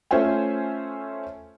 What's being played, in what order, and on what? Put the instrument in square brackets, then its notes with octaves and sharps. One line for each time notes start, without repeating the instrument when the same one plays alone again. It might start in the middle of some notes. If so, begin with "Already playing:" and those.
[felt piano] A3 C#4 F4 C5 E5 G#5